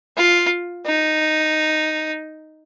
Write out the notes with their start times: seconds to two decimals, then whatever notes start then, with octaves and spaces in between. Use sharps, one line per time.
0.17 F4
0.86 D#4